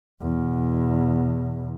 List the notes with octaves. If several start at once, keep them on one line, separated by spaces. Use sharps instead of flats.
E2 B2